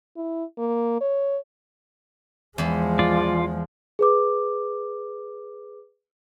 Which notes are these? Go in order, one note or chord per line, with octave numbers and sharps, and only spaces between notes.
E4
A#3
C#5
E2 F3 G#3 B5
F4 D5
G#4 B4 D6